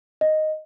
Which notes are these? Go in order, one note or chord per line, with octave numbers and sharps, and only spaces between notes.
D#5